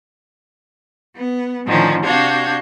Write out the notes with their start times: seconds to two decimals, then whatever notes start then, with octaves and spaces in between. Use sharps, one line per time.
1.16 B3
1.65 A2 D3 D#3 F3 C#4
2.04 C3 D4 F#4 F5 G6 G#6